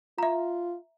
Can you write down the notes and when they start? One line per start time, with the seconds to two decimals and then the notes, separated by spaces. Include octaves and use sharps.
0.18 F4 E5 A#5